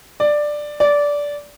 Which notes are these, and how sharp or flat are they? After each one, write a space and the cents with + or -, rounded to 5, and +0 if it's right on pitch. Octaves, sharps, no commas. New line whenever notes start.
D5 +10
D5 -15